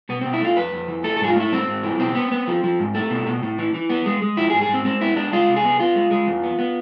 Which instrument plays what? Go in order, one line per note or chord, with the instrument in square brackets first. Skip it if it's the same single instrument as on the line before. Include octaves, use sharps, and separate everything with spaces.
[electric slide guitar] B2 B3
B2 C4
E4
A3 F4
F2 B4
F2
E3
A3 A4
A4
G#2 G#4
F4
A3 E4
G#2 C4
G#2
E3
B2 C4
B3
B3
F3
F3
G#2
A3
B2
B2
A2
E3
E3
B3
G#3
G#3
F3 E4
G#4
G#2
G#4
G#2
C4
G#3 C4
B3 E4
G#3 D4
G#3 F4
C3
G#4
B3
B3 F4
G#3
G#3
E2
B3
B3